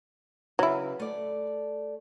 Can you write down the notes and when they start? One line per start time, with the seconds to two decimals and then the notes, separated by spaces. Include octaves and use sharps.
0.59 C#3 F#3 E4 B4
1.00 A3 D5